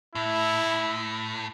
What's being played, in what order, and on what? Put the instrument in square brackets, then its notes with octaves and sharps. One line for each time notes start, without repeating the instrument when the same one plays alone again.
[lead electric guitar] A2 [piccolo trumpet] E4